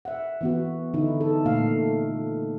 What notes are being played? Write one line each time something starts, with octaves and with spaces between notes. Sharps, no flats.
E5 F#5
E3 B3 F#4
D3 D#4 E4
A4
A#2 A3 F5